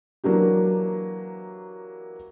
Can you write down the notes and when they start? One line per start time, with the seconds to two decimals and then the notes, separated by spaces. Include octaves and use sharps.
0.24 E3 F#3 A#3 D4 G4